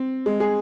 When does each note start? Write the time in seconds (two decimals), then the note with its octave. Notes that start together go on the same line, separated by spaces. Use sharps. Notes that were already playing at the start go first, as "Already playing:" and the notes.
Already playing: C4
0.26 G#3
0.40 G#4